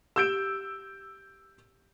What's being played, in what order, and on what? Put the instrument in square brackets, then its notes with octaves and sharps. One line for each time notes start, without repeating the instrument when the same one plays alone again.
[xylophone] G4 [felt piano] E6 G6 D7